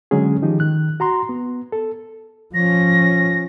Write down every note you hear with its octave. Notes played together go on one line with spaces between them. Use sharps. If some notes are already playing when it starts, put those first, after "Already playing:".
D3 F#3 G#3 C#4 G#4
D#3 F3 D#4 G4
D#3 F#6
F#4 A#5 C6
B3
A4
F3 C#4 A#6